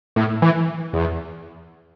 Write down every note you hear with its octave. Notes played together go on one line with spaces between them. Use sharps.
A2
E3
E2